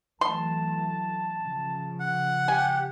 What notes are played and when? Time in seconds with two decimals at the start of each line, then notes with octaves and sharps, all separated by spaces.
0.21 E3 F#3 A3 A5 C6
1.42 C#3 F3
2.00 F#5
2.48 G4 G#5